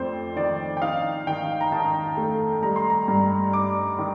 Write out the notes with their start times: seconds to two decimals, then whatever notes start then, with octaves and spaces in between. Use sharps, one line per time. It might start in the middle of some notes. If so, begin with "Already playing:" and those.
Already playing: F2 A3 C4 C5 D5
0.36 D#3 D5
0.77 G5
0.82 D#4 F5
1.27 D#3 G5
1.61 A#5
1.72 D#3 A5
2.17 A3
2.63 G3 A#5
2.76 C6
2.90 A#5
3.08 G2
3.53 D4 D6
3.99 D#3